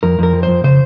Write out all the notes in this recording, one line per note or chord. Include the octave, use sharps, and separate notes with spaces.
F2 A#4
F2 A#4
F3
C5
F2
C#3 C5